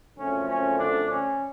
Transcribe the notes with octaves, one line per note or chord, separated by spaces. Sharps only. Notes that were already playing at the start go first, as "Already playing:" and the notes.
F#2 D3 F3 A3 C4 C#4
C#4
D3 D4
C#4